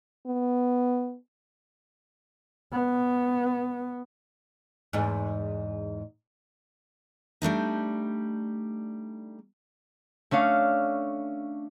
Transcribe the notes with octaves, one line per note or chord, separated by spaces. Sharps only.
B3
B3
E2 G#2
G3 A3 D4 D#4
A3 C#4 D4 F5